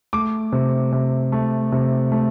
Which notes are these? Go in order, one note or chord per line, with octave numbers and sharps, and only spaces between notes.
A3 D6
C3
C3
A3
C3
A3